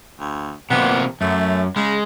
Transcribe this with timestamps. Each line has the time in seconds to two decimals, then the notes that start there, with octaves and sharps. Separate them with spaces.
0.20 D2
0.70 C3 F3 A#3 B3
1.21 F#2 A3
1.76 C#3 G#3